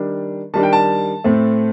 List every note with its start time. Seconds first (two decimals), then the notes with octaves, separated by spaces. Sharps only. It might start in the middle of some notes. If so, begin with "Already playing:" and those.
Already playing: D#3 G3 D4
0.54 D#3 G3 D4 A5
0.63 G5
0.73 A5
1.24 A2 A3 C4